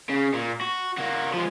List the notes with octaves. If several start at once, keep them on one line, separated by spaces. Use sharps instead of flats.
C#3
A#2
F#4
A#3 F#4
F3 G#3